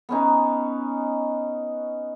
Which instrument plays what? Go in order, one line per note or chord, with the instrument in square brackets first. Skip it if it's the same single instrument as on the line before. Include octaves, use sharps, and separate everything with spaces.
[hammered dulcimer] B3 C#4 D#4